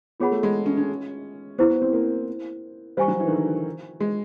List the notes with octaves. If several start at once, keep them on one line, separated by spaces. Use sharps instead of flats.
B3 F4 G#4 C#5 F#5 B5
A3
G#3
C#4
C#4
B3 E4 G4 C5
B3
C4
A#3
G3 C5 F5 G#5 C#6
F#3
E3
D#3
D3
G#3